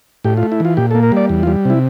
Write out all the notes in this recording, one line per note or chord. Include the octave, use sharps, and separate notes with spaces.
A2 G4
F4
A3
E4
E3 F4
A#2 G4
A#3 A4
A#4
G3 D5
E2
G3 F4
C3 E4